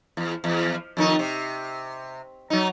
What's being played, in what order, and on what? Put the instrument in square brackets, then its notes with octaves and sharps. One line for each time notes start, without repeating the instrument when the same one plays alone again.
[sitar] E2
E2
F2 D#3 D#4
C3
F#3 D#4